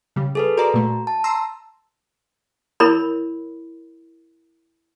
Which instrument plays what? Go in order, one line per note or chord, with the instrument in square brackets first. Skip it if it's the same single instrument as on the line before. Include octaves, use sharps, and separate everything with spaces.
[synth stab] C#3 G3
[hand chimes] G#4 A4 B4
[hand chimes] F#4 A#5 [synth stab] A#4 D5
[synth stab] A#2 A3
[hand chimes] A5
[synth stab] A#5 C6 E6
[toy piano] E4 A#4 C#5 B5